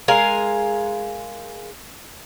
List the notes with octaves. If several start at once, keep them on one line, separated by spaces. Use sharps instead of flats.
G#3 A#4 F5 G#5